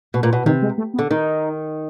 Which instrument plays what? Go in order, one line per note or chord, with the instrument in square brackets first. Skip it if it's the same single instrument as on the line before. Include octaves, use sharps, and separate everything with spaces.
[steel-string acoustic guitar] B2
A#2
B2
[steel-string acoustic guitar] C3 [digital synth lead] D#3
[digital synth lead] G#3
A3
B3
[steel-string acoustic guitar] D3
[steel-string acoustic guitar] D#3 [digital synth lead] D#4